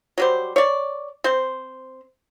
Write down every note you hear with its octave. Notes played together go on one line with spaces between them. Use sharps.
F#3 G3 C5
C#5 D5
C4 C5